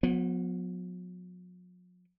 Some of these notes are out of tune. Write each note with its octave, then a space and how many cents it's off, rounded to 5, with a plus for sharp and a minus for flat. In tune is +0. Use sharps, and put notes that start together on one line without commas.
F#3 -45 B3 +0